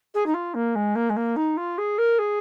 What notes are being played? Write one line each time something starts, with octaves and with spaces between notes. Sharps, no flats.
G#4
D#4
F4
A#3
G#3
A#3
G#3
A#3
D#4
F4
G#4
A#4
G#4